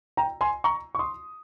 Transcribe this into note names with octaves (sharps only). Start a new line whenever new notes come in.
G5 A#5
G#5 C6
A#5 C#6
C#6
C6 D#6